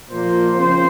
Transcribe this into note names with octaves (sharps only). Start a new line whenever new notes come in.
A#2 F3 A#3 C5
C#3 F3 C4 C5